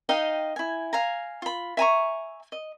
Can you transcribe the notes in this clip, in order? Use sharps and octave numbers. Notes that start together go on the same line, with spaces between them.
D#4 D#5 F5 G5
E4 G#5
F5 G#5 A#5
F4 B5
E5 G#5 A#5 C#6
D#5